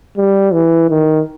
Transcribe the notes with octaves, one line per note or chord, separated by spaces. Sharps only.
G3
E3
D#3